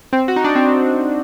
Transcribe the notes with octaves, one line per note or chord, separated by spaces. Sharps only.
C4
F#4
D#4
D4
C4